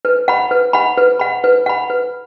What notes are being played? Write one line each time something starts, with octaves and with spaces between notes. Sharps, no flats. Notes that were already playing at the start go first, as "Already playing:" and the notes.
B4
F#5 B5
B4
F#5 B5
B4
F#5 B5
B4
F#5 B5
B4